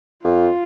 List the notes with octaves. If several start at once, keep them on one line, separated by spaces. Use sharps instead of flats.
F2 F4